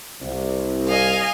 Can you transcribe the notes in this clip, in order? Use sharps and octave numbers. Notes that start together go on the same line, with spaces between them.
C2
D#5 F5 G#5